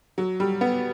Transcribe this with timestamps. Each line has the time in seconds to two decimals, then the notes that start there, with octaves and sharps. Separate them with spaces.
0.18 F#3
0.40 G3
0.61 B3